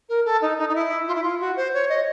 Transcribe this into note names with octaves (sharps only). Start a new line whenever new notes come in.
A#4
A4
D#4
D#4
D#4
E4
F4
E4
F4
F#4
C5
C#5
D#5